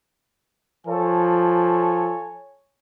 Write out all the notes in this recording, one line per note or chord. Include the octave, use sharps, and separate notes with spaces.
F3 A4 C#5 G#5